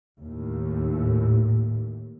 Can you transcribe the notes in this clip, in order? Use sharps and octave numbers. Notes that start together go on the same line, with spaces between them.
D#2 A2